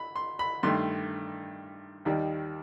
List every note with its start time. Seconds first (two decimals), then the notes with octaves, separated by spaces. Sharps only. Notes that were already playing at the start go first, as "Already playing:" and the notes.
Already playing: B5
0.16 C6
0.39 B5
0.63 G2 D#3 A3 C6
2.05 D#2 D#3 G3